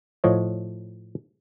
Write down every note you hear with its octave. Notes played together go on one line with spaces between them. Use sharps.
A2 F3 C#5 D#5